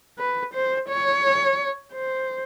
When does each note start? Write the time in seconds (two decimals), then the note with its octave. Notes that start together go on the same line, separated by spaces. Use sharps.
0.19 B4
0.54 C5
0.89 C#5
1.94 C5